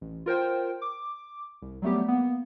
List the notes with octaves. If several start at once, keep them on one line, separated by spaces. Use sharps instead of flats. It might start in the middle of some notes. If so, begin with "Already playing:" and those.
A1
F4 A#4 C5 G5
D6
C2
F#3 G3 A3 B3 G4
A#3 B3